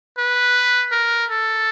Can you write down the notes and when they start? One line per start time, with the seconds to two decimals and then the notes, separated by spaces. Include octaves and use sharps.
0.18 B4
0.92 A#4
1.30 A4